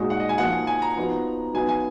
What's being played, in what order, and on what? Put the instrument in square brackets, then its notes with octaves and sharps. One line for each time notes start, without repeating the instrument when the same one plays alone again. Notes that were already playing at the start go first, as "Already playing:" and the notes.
Already playing: [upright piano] A#2 G#3 D#4 F#4
[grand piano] F#5
D#5
G#5
[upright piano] F3 A#3 D#4 F#4 [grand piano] F#5
[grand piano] G#5
A#5
[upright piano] F3 B3 D#4 F#4
[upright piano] F#3 B3 D#4 [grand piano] G#5
[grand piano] G#5